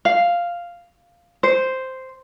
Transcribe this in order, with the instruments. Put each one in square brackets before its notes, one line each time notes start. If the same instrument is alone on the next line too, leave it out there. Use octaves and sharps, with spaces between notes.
[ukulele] F5
C5